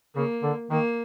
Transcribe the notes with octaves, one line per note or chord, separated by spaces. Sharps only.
C#3 A#3
D3
D#3 A#3